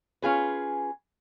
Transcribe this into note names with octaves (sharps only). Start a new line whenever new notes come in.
C#4 F4 G#4 B4